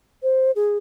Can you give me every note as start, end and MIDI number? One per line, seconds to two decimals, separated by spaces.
0.23 0.51 72
0.56 0.78 68